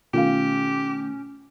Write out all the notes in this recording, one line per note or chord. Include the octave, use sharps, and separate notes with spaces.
B2 D#3 A3 C#4 F4 G4 F5